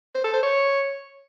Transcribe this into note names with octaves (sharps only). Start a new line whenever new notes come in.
C5
A4
C5
C#5